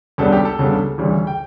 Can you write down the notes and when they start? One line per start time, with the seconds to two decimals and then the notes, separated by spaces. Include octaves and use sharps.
0.18 C#2 C#3 G3 B3 D4 A4
0.32 G4
0.45 A4
0.59 C#2 C#3 G3 B3 D4
0.98 D2 C#3 E3 G3
1.27 G5